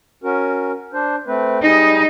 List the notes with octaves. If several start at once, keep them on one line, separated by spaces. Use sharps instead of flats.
C#4 F#4 A#4
D4 C5
A3 C4 B4
G3 D#4 G#4